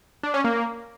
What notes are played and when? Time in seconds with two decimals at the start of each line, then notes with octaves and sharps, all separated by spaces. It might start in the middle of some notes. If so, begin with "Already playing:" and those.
0.23 D4
0.34 C#4
0.44 A#3